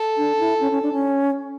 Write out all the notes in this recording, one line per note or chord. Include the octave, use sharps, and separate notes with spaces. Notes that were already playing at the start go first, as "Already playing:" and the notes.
Already playing: A4
D4
E4
C#4
C#4
D4
C#4